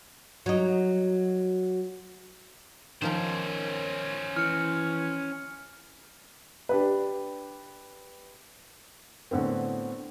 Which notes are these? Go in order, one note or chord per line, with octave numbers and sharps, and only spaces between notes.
F#3 D#4
D#3 F3 C#4 A#4 C5
E3 F6 C#7
D4 G4 B4
A2 D3 B3 C4